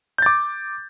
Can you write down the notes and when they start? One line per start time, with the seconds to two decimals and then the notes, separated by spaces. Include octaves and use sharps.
0.18 G6
0.22 A6
0.26 D6